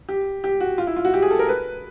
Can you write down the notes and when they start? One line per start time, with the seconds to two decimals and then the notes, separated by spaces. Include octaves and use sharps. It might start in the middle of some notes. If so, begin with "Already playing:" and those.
0.09 G4
0.44 G4
0.60 F#4
0.78 F4
0.87 E4
0.96 F4
1.05 F#4
1.14 G4
1.22 G#4
1.31 A4
1.39 A#4
1.49 B4